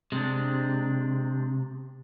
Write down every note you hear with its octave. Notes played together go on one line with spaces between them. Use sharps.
C3 G#3 C4 D4